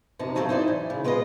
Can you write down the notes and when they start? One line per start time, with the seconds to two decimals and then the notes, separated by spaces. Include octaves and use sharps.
0.19 F#2 C3 D#4 A5
0.35 B2 F#3 B3 C4 F4 A4
0.49 D#4 E4 C5 D5
0.68 E3
0.90 C#3
1.04 G#3 F4 B4 C5 D#5